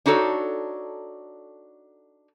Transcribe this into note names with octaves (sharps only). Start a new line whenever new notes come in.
D4 D#4 F#4 A4 C#5